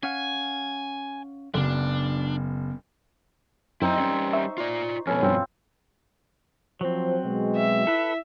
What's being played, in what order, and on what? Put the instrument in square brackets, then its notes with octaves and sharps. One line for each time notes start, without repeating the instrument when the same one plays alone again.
[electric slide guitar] C#4 F5 F#5 [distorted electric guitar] G#5
[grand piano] F#1 [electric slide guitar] F#3 B3 [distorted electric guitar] D4
[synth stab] F#2 [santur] C4 D#4 [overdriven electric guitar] E4 D#5
[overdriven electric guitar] G3 C#4
[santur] D#4 C6 C#6 [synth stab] E5
[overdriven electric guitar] F4 D5
[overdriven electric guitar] F2 B2 [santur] C#4 A4 B4
[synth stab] G2 [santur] C4 F4
[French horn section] F3 C5 [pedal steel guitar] F#3 C4
[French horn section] B2 G#3
[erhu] E5
[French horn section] E4 [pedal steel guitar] A4 B4